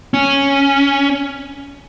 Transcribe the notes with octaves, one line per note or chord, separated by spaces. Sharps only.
C#4